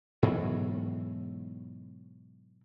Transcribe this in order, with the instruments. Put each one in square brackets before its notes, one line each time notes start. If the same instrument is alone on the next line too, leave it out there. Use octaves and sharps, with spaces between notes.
[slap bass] G#2 B2 E3 F#3